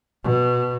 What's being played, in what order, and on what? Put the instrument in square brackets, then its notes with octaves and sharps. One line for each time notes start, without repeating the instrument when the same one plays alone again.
[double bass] B2